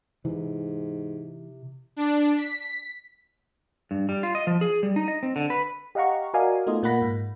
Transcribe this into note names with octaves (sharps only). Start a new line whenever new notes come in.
G#2 C3 E3
D4
B6
G2
G3
F4
D#5
F3
G#4
G3
D#4
D#5
C4
D3
B4
G4 D#5 F5 F#5 A#5 C#6
F#4 A#4 D5 D#5 F5 G#5
A3 B3 D#4 F4 D#5
A#2 A#3 F#5 B5 A#6 B6
G#2